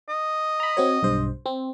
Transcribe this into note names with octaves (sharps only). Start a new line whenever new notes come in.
D#5
A#5 B5
C4 F#4 C#5
B1 G2 C5
C4